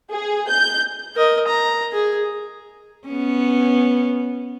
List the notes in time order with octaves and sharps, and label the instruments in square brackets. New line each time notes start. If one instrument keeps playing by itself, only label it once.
[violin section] G#4
G6
[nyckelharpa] A#4 D#5
A#5
G#4
[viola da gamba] B3 C#4